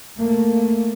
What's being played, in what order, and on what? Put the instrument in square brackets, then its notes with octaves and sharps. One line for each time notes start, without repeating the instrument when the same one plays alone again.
[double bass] A3 A#3